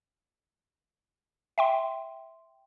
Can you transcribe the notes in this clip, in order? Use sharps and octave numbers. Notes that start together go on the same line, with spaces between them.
E5 G5 C6